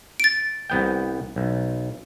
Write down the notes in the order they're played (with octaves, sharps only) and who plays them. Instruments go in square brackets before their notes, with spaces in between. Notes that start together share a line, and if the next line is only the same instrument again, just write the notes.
[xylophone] A6 D7
[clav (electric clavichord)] C2 B3 G5
B1